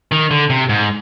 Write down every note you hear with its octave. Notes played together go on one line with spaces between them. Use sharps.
D#3
D3
C3
G#2